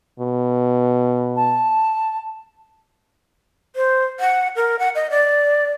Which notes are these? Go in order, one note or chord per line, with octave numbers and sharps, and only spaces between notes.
B2
A5
C5
F#5
A#4
F#5
D#5
D5